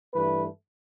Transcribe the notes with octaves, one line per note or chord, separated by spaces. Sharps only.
G2 E3 A3 B4